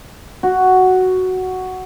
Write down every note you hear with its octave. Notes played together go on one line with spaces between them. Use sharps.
F#4